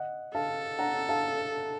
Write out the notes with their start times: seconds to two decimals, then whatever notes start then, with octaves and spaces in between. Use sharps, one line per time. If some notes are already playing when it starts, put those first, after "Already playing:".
Already playing: D#5 F#5
0.34 A4 F5 A5
0.79 F#5 A#5
1.09 F5 A5